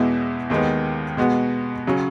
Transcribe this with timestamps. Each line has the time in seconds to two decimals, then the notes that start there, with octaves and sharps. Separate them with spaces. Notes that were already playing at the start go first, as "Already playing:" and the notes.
Already playing: E2 B2 G#3 B3 E4
0.50 D#2 D#3 G#3 B3
1.17 B2 G#3 B3 F#4
1.87 C#3 F#3 C#4